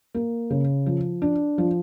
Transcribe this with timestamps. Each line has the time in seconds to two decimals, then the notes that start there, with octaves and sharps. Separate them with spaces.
0.14 A#3
0.50 C#3
0.86 F3
1.22 D4
1.58 F3